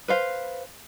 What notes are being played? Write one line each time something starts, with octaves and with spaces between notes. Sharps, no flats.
B4 C5 F5